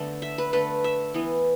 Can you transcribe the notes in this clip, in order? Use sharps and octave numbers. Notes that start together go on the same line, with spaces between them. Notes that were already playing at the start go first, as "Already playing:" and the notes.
Already playing: D3 A3 B3
E5
B4
D3 A3 B4
E5
E3 B3